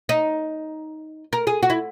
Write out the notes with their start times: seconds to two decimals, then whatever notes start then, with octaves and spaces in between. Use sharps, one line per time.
0.09 D#4
1.33 A#4
1.47 G#4
1.63 F#4
1.70 E4